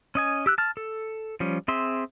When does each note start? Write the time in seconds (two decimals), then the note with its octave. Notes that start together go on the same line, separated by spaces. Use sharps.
0.15 C#4 D#5 G#5
0.46 G4 E6 F#6
0.58 A5 F6
0.77 A4
1.40 F3 G3 C#4
1.68 C4 G#4 E5 C6